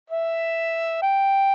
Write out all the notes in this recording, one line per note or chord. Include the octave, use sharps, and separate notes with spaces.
E5
G5